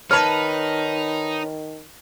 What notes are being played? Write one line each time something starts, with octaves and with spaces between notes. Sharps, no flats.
D#3 D#4 B4 C#5 A5 F6